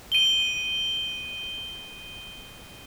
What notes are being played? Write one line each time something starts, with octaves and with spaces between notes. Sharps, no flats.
D#7 G7